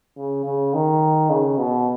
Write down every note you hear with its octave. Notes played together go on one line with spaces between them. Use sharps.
C#3
C#3
D#3
C#3
B2